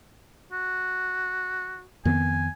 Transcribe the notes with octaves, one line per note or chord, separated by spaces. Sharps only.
F#4
F2 D#3 B3 G#5